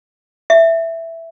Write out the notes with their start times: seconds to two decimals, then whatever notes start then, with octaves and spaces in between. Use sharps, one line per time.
0.50 E5